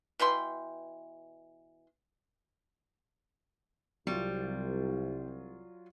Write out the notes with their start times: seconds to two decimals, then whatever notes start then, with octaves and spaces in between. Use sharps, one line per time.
0.19 B2 E3 G5 C6
4.07 C2 F#3 G3 F4